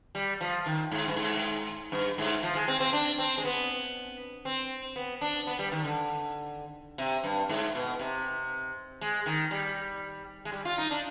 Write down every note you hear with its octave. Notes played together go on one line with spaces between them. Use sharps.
G3
F3
D#3
G#2
G2
G#2
G2
G#2
F3
G#3
C4
C4
D4
C4
G#3
B3
C4
B3
D4
B3
G3
D#3
D3
C3
G2
G#2
B2
C3
G#3
D#3
G3
G#3
G3
F4
D#4
D4